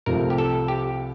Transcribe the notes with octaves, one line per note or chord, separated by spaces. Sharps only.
C2 C3 F3 A3 A#4
G4
A4
G4